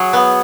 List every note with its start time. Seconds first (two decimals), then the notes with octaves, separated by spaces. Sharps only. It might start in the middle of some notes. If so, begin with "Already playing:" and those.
Already playing: F#3 G#4 C#5
0.13 B3